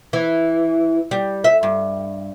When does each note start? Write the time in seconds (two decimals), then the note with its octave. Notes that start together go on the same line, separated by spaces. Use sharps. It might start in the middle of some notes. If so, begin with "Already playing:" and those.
0.13 E3
1.11 G3
1.44 E5
1.63 G2